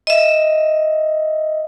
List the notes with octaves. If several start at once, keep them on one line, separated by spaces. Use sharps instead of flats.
D#5 E5